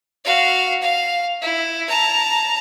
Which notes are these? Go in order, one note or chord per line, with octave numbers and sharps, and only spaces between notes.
F#4 F5
F5
E4
A5 A#5